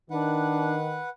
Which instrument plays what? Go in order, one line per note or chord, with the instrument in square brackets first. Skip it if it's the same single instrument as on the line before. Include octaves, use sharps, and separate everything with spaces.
[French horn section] D#3 [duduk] D4 [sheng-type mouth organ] B4 F#5